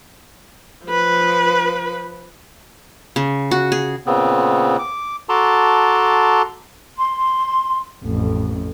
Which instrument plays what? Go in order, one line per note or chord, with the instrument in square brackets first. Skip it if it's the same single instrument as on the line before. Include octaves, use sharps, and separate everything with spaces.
[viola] F3 B4
[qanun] C#3
F#4
G#4
[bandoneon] A#2 C#3 B3 C4
D6
F#4 A4 A5 A#5 C6 D6
[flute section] C6
[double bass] A1 F2